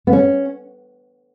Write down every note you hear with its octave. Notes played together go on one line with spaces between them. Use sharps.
B3
C#4